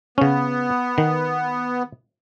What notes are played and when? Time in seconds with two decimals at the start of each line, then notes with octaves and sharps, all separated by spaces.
0.18 C#3 B3 C#4
0.98 D#3